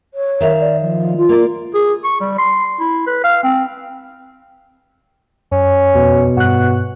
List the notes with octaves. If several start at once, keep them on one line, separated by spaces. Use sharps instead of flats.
C#5
D#3 E5 F5
D5
F3
F4
A#3 D5
G#4
C#6
G3
C6
E4
B4
F5
C4
F#2 C#4
F2 B2
G2 F#4 F#6